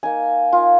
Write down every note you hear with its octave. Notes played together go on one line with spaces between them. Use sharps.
A#3 D#4 G#5
A#3 D#4 F4